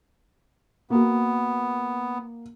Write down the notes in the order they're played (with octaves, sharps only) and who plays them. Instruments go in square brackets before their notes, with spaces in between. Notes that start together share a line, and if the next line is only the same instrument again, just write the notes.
[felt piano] A#3 F#4 [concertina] B3